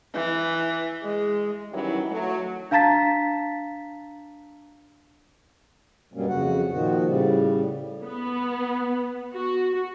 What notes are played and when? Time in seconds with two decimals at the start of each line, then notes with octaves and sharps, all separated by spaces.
0.14 E3
1.03 G#3
1.72 D#3 E3 F#3 G3 C#4 E4
2.10 F#3 A3
2.71 D4 F5 A5 A#5 A6 B6
6.14 G2 B2 F#3 G3 A#3 C#4
6.29 F2 C#3 F#4 F#5
6.72 A#2 D#3 F3 F#4
7.05 A2 C#3 G3
8.03 B3
9.33 F#4